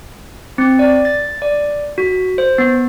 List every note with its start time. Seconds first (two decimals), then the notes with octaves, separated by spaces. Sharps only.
0.58 C4
0.79 D5
1.05 A6
1.42 D5
1.98 F#4
2.38 C5
2.58 B3